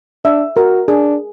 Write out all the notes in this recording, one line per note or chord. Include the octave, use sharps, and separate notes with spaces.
D4 E5
F#4 A#4
D4 G#4